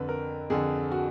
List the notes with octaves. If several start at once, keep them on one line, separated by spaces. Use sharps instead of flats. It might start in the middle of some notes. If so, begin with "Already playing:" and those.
Already playing: F2 D3 B4
A#4
F2 D3 G#4
F#4